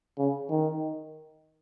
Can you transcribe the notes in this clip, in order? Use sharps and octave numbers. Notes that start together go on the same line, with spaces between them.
C#3
D#3